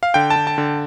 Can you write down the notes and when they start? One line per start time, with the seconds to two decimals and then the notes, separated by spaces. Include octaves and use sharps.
0.03 F5
0.14 D3 G5
0.30 A5
0.36 D3
0.47 A5
0.58 D3